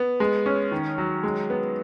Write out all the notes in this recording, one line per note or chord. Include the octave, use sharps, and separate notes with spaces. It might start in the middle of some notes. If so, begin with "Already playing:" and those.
Already playing: B3
G#3
C#4
D#3
F#3
G#3
B3